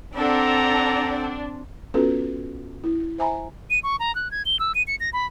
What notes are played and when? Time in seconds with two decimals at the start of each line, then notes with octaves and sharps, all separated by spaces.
0.17 C4 D4 A4 F#5 A#5
1.94 B3 C#4 F4 F#4 A4 B4
2.84 E4
3.18 C5 E5 G#5 A#5 B5
3.70 D#7
3.83 C#6
3.99 A#5
4.15 F#6
4.31 G#6
4.45 G7
4.59 E6
4.75 D#7
4.87 C#7
5.00 A#6
5.13 B5